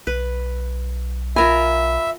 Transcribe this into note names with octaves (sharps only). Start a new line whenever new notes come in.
B1 B4
F4 A#4 E5 G#5 B5